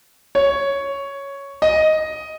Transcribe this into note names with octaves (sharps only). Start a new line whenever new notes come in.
C#5
D#5